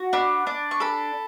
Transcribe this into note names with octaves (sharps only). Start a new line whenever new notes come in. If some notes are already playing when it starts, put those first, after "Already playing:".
Already playing: F#4
D4 B5
D4
C#6
A4 B5